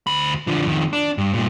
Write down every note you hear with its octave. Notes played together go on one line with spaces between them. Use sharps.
D2 B5
D3 F3
F2 D#3
D4
G2
G2 A#2